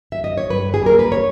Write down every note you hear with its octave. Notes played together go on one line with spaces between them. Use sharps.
E5
D#5
C#5
G2 B4
G#4
G3 A#3 A#4
B4
C#5